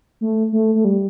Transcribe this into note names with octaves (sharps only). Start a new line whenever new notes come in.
A3
A3
A3
G3